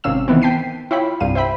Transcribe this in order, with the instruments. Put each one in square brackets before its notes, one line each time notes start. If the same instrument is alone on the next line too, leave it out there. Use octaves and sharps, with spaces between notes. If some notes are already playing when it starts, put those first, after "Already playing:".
[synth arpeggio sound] G#1 C3 C#4 F5 E6 E7
D#3 E3 B3 C4
G5 A5 B6 C7 D#7
E4 F4 C#5 G5 B5
C2 G2 F5 D#7
C5 E5 G5 B5